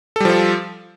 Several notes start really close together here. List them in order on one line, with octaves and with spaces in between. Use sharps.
A4 G3 F3 F4